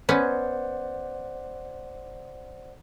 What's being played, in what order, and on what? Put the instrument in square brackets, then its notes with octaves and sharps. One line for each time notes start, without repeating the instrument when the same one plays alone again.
[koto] B3 C#4 [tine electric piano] C5 D5 F#5